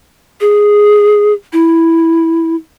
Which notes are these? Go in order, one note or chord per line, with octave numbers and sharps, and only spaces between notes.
G#4
E4